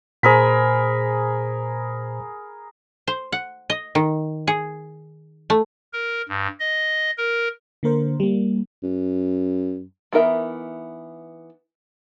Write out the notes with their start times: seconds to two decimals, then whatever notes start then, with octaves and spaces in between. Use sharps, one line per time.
0.23 A#2 G#4 A#4 C5 B5
3.08 C5
3.32 F#5
3.70 D#5
3.95 D#3
4.47 G#4
5.50 A3
5.93 A#4
6.29 G2
6.59 D#5
7.18 A#4
7.83 D3 A#3 A#4 C5
8.20 G3 A#3
8.83 F#2
10.13 E3 B3 D#4 A#4 E5